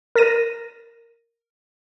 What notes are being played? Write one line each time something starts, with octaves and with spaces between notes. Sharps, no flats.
A#4 A6 A#6 D#7